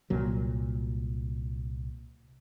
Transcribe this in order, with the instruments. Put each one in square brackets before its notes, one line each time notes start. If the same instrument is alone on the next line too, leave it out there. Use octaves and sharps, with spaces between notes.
[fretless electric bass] C2 A#2 F#3